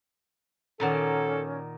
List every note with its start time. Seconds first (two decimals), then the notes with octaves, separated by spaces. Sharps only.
0.80 A#2 D#3 C#4 F#4 A4 A#4 D5